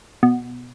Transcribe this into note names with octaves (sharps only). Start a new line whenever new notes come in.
B2